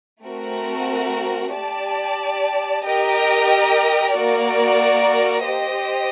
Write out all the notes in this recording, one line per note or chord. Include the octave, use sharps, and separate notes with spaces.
A3 C4 F#4 A#4
G4 D5 A5
G4 A#4 D#5 G5
A#3 F#4 A#4 D5
G4 C5 D#5